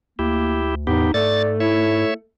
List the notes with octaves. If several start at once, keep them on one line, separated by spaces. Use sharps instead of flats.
D2 A#3 E4 G4
E2 A2 B3 D#4 G4
G#2 A3 D5 A6
E4 C#5 E5